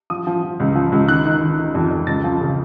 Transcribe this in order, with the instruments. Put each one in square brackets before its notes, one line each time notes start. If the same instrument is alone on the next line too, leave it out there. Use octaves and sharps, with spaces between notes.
[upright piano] F3 D#6
F3
F3
C#2
F3
C#2
D#3 F#6
D#3
D#3
D#3
F2
F2
C#2 A6
F3
C#3